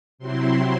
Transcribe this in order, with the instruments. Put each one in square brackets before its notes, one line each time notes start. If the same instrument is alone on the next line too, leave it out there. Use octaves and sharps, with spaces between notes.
[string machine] C3 F#3 C4 E4 C6